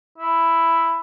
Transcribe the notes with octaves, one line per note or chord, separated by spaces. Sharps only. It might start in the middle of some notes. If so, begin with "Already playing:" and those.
E4